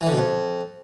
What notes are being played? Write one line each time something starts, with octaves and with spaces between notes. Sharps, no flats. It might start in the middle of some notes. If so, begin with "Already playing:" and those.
E3
D3
B2
F2